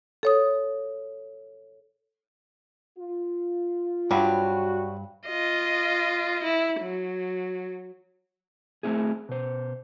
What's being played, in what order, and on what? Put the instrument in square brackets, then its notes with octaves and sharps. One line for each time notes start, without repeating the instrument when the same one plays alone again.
[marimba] A4 C#5 D#6
[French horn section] F4
[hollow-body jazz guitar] G2 [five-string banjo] F#3 G3 C4 [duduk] F#4
[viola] F4 D#5
E4
F#3
[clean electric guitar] A3 A#3 C4 E4 G#4
B2 C5